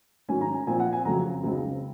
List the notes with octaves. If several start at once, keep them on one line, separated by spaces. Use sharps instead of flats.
G#2 D#3 F#3 C#4 G#5
A#5
G#5
A#2 F3 C4 F4 G#5
F#5
G#5
F2 C#3 F#3 A#5
C#2 C#3 F#3 C4 D#4